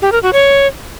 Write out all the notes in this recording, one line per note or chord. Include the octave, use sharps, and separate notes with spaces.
G4
A#4
F#4
C#5